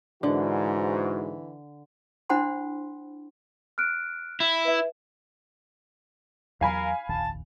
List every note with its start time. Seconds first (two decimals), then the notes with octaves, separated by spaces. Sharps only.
0.23 G#2 D3 E3 F#4
2.30 D4 E4 C5 F#5 B5 C6
3.78 F6 F#6 D7
4.40 E4
4.65 B4 E5
6.61 E2 F#3 A#4 F5 G#5 B5
7.09 F1 A#1 D#2 A5